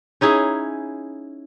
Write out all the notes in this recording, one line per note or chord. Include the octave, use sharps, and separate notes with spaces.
C#4 D#4 E4 G#4